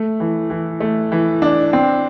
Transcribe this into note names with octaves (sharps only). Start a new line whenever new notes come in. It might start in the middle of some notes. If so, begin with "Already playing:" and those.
Already playing: A3
E3
E3
A3
E3
D4
C4